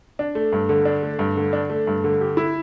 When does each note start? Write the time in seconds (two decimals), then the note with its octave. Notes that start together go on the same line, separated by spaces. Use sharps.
0.19 D4
0.35 A3
0.52 G2
0.69 D3
0.85 D4
1.03 A3
1.19 G2
1.37 D3
1.53 D4
1.70 A3
1.87 G2
2.04 D3
2.21 G4
2.37 E4